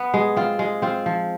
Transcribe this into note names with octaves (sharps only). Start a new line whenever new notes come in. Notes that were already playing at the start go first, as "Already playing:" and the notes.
Already playing: B3
G#3
C4 F4
G#3
C4 F4
F3